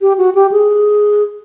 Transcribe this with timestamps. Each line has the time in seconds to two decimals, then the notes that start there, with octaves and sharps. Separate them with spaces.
0.01 G4
0.18 F#4
0.35 G4
0.52 G#4